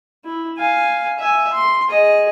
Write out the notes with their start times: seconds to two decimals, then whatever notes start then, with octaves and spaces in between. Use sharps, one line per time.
0.25 E4
0.57 F5 G#5
1.19 E5 G#5
1.52 C6
1.89 G#4 D#5